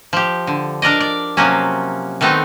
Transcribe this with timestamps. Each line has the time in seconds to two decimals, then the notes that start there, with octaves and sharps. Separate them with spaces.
0.13 F3 G4
0.47 D3
0.82 D4 A#4 D5 D#5
1.01 D5
1.37 C3 F3 F#3 A#3 C#4
2.21 D#3 A3 B3 C4 D#4